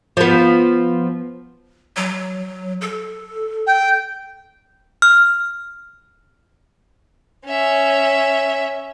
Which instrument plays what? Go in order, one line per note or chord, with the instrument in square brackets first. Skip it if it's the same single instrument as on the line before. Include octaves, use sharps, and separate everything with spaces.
[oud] F3 B3
[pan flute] F#3
A4
[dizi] G5
[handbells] F6
[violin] C#4 E5